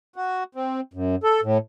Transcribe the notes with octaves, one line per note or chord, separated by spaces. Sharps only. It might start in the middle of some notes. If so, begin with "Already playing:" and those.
F#4
C4
F#2
A4
A2